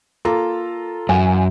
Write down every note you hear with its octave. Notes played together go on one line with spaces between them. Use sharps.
A#3 F4 A4 A#5
F#2 E3 F5 G#5